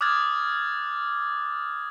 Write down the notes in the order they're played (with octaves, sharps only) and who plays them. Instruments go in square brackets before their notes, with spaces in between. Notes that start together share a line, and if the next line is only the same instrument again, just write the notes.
[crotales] D6 D#6 F6 F#6 G#6 A6